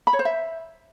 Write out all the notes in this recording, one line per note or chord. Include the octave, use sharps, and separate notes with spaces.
B5
C#5
C5
E5